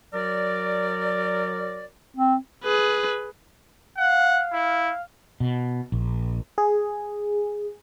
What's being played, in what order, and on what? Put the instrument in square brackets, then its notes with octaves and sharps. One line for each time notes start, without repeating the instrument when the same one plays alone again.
[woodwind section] F#3 A#4 D5
[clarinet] C4
[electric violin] G#4 B4
[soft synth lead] F5 [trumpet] F#5
[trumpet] E4
[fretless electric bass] B2
A#1
[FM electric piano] G#4